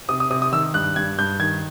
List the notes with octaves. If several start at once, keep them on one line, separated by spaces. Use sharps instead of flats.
C3 D#6
D#6
C3 D#6
D#6
D#3 E6
G2 F#6
G2 G#6
G2 G6
D#3 G#6